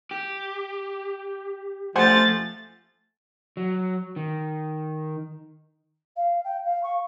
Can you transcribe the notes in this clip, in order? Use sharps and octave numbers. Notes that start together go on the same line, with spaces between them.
G4
F3 A3 C5 F#5 G#5 A6
F#3
D#3
F5
G5
F5
C#6